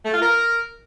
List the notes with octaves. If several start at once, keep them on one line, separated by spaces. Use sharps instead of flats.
A3
F4
A#4